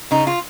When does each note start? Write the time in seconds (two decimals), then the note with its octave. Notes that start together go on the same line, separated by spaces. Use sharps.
0.11 C#3 D#4
0.27 F4